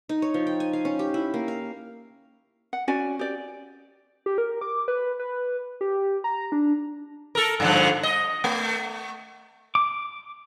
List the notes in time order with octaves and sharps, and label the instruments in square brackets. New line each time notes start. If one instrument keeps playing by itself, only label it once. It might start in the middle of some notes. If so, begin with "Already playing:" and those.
[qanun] D#4
C#5
F3
G5
G#5
F5
C#4
G4
E4
A#3
F5
[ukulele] F#5
C#4 F#4 D5 G#5
G4 D5
[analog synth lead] G4
A#4
D6
B4
B4
G4
A#5
D4
[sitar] A4 A#4
G2 D3 F3
D#5
A3
[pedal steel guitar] D6